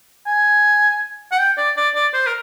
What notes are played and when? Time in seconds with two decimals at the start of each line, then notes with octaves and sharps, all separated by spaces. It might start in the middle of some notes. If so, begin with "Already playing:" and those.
0.26 G#5
1.32 F#5
1.39 G5
1.58 D5
1.76 D5
1.95 D5
2.13 C5
2.26 A#4